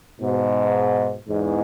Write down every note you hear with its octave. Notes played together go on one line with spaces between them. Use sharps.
G#2 B2
E2 G#2